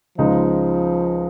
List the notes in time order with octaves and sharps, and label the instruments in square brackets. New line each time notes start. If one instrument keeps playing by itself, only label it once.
[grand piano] C#2 C#3 G#3 D#4 [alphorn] F3